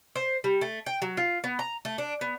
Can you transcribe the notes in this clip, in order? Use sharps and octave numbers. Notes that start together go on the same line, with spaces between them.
C5
G3
A3
G5
F#3
F4
B3
A#5
A3
D4
B3